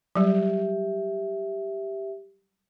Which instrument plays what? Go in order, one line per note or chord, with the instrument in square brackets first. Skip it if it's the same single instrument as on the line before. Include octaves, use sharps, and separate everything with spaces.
[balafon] F#3 G3 [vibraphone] G4 E5